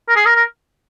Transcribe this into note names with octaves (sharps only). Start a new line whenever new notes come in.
A#4
G#4
A#4
A#4